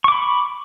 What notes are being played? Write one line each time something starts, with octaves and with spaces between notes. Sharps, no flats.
B5 C#6 D6